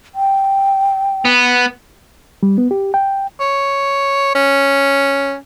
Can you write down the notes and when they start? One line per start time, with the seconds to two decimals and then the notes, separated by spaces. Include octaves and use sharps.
0.15 G5
1.25 B3
2.43 G3
2.58 B3
2.71 G4
2.94 G5
3.40 C#5
4.35 C#4